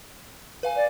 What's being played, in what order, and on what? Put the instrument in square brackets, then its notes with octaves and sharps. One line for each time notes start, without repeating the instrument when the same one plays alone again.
[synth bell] B4 F5 G#5
[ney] D5